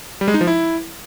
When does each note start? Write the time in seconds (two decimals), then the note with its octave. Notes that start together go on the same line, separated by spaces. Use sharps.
0.21 G3
0.28 G#3
0.34 D#4
0.41 F3
0.47 E4